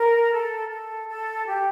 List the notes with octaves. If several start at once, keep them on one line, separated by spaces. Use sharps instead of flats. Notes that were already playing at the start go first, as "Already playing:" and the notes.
Already playing: A#4
A4
A4
A4
G4